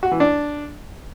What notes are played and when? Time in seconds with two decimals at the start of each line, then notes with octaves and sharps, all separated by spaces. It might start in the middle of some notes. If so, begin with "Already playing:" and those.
0.03 F#4
0.11 E3
0.20 D4